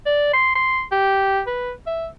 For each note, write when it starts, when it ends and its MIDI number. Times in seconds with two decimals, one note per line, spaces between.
0.06 0.29 74
0.33 0.50 84
0.56 0.82 84
0.92 1.42 67
1.47 1.72 71
1.87 2.08 76